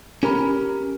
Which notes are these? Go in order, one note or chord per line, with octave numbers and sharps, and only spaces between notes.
C#4 G4 A#4 A#5 B5